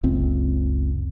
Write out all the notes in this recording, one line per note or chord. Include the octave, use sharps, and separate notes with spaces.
F#1 C#2 C4